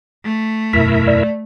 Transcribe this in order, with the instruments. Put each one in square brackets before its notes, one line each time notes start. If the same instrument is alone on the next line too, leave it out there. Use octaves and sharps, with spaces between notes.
[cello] A3
[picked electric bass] E1 F#2 B2 [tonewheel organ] E4 A#4 E5 [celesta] B6
[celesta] D5